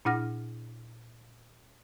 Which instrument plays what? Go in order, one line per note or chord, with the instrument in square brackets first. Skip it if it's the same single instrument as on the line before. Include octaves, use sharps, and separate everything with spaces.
[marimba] A#2 D4 E4 F#5 F6 A#6